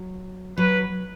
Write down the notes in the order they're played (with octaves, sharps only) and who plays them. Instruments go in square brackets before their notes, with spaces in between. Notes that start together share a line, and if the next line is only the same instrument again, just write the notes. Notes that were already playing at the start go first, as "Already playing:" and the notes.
Already playing: [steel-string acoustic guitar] F#3
[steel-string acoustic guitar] F#3 [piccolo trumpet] B4